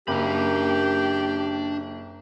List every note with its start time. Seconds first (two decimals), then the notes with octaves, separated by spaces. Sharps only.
0.08 F#1 A#3 D4 G4 B5